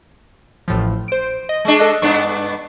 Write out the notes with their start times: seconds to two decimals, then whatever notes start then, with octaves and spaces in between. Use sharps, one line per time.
0.68 A1 A2 F3
1.08 C5 D7
1.49 D#5
1.65 G#3 D4
1.79 A4 D#5 F#6
2.02 G2 B3 D4 C#6